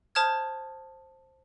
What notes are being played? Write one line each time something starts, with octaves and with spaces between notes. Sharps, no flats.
C5 A5 D#6 F6 G#6